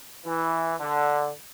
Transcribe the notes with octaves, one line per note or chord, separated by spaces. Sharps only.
E3
D3